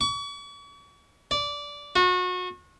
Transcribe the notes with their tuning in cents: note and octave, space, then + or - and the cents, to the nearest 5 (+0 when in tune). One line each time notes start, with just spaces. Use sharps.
C#6 +40
D5 -15
F#4 -30